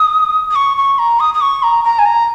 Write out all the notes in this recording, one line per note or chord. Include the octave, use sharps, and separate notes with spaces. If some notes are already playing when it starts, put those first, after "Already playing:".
Already playing: D#6
D#6
C#6
C#6
A#5
D#6
D#6
C#6
A#5
A#5
G#5
A#5